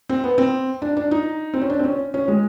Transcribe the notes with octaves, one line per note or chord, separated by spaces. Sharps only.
C4
B3
C4
D4
D4
D#4
C4
C#4
D4
C4
C#4
C#4
G#3